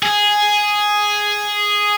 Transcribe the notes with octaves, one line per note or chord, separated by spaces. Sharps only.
G#4